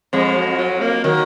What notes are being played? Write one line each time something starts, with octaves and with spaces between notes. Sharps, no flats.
F2 F3 G#3
F#3
F#3
A#3
D#3 F#3